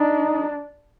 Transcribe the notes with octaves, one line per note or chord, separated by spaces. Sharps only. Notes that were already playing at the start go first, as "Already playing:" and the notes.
Already playing: D4 D#4